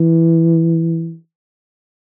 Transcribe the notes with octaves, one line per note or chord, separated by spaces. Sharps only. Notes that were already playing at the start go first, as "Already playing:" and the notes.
Already playing: E3